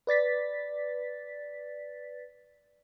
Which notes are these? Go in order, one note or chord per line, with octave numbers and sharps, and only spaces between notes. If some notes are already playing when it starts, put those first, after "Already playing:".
B4 D5 A6 B6